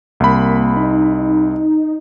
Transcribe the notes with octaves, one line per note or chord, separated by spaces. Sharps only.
C2 A#3 B5
D#4